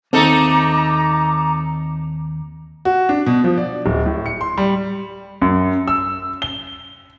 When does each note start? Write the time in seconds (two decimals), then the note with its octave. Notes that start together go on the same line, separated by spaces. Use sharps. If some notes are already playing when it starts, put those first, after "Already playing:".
0.13 D#2 A3 C4 D#4 A4 A#5 D6
2.85 F#4
3.09 D4
3.26 B2
3.44 F3
3.58 D5
3.86 D1
4.06 A2
4.26 C#7
4.41 C6
4.58 G3
5.42 F#2
5.88 E6
6.42 G7